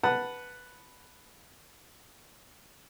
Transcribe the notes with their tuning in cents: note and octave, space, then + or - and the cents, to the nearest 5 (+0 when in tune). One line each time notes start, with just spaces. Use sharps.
B4 +0 F#5 +0 A5 +0